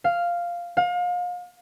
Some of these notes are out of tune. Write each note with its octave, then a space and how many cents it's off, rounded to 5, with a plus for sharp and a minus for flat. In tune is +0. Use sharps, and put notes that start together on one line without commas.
F5 -5
F5 +35